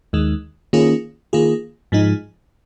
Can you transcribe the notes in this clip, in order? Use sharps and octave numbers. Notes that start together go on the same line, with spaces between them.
D#2 D#3 G#3
D#3 A#3 C#4 F4 G#4
D#3 A#3 F4 G#4
G#2 F3 G#3 D#4